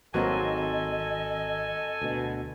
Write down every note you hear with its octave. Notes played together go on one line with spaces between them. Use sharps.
G#1 F#3 A#3 C4 A4 D#5 G#5
D2 B2